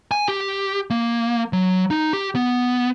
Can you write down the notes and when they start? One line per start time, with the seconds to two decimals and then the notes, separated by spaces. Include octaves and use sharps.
0.11 G#5
0.28 G4
0.90 A#3
1.53 F#3
1.90 D#4
2.13 G4
2.36 B3